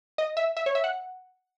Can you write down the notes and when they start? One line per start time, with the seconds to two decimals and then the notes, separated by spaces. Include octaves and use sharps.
0.18 D#5
0.37 E5
0.57 E5
0.66 C#5
0.75 E5
0.84 F#5